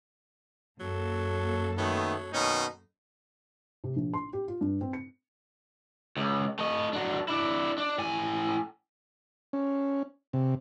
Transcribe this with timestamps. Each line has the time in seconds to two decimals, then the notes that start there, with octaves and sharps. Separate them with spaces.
0.80 F#2 F#3 A#3 A4
1.78 D#3 F#3 A3 B3
2.34 B2 D#3 C#4 D#4
3.84 C3
3.96 A#1
4.14 C6
4.33 G4
4.48 F4
4.61 G2
4.81 C4
4.93 C#7
6.17 C#2
6.59 A3 D#5
6.93 F#3 D4
7.28 D4 E4
7.78 D4
7.98 A2 G#5
9.53 C#4
10.33 C3